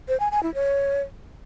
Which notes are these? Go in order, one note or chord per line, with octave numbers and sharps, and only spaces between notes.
C5
G#5
G#5
E4
C#5